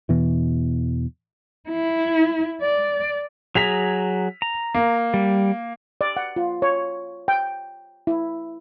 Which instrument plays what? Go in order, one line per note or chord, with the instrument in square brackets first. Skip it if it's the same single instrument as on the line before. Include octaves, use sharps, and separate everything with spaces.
[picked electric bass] E2 B2 E3
[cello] E4
D5
[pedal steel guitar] F#3 G#4 A#5 [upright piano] B6 F7
[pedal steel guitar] A#5
[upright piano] A#3
[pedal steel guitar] G3
[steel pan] D5
F#5
F4
C#5
G5
E4